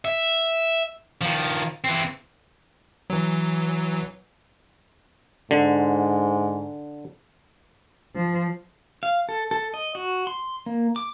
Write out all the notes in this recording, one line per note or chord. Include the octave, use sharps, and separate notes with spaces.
E5
D#3 F3
E3 C4
E3 F#3
G#2 D3
F3
F5
A4
A4
D#5
F#4
C6
A#3
D6